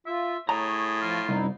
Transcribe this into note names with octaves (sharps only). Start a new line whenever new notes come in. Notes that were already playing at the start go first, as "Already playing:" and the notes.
F4 E5
A2 G#4 C#5 A#5
F3 F4
C2 F#2 D#4 E4